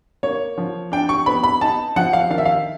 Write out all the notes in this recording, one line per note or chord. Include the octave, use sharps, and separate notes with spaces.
A#3 C#5
F3
D4 G5
C#6
B3 B5
B5
D#4 A5
F3 F#5
F5
D#3 F5
E5
F5